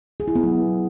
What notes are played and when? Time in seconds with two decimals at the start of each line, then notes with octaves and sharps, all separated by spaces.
0.20 G#4
0.28 E4
0.35 B3
0.43 F#3